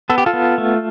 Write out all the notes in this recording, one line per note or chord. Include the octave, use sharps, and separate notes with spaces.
B3 A4
G4
F4 A4
B3
A3